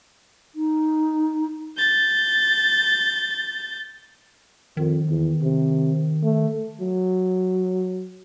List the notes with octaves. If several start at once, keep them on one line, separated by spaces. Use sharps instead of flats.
D#4
G6 A6
F2 D#3
E2
C3
A3
F#3